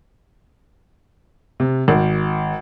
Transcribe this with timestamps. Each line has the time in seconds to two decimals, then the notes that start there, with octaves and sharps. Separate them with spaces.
1.60 C3
1.88 G#1